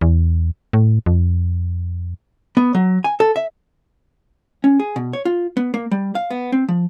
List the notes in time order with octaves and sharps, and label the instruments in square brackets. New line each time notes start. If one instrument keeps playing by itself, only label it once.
[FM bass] E2
A2
F2
[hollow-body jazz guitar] B3
F#3
G#5
A4
E5
C#4
G#4
B2
C#5
F4
B3
A#3
G3
F5
B3
C4
F3